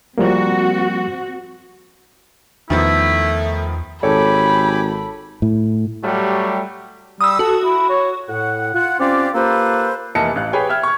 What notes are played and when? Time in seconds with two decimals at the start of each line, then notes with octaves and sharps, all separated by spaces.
0.18 F3 G3 A#3 C4 F#4
2.70 E2 D#3 F3 A3 B3 E4
4.03 G#1 G4 A4 C#5 G#5 B5 D6
5.42 A2
6.04 F#3 G3 A3 G4
7.21 G3 D#6 E6
7.39 F#4 A4
7.65 E4
7.90 C#5
8.29 A2 F#5
8.74 F4 F#5
9.00 C4 C#4 F4 G4 D5 F5
9.35 A#3 F4 G4 A4 B4 C5
10.15 F1 E3 A#3 D#5 A5 C#7
10.36 A1 F5 F#6
10.53 G4 G#4 B4 C#5 G5 G#5
10.69 E5 G5 F6 G#6
10.83 C#6 G#6